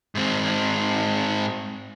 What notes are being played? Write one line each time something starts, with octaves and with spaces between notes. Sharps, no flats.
G#2 C4